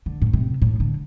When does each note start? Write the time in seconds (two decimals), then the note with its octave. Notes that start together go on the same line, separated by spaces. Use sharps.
0.06 D3
0.22 A2
0.33 C3
0.62 A2
0.80 D3